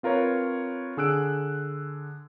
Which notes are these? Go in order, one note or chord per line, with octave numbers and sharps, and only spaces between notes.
C4 F4 A#4 B4 C#5
D3 G#4 E6 F#6 D7